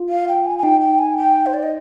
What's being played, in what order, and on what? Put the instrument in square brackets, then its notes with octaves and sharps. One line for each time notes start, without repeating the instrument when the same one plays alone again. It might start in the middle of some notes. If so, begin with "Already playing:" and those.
Already playing: [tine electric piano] F4
[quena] F5
G5
G#5
G#5
[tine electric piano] D#4 [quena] G5
[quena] G5
G#5
G5
C5
D5
D#5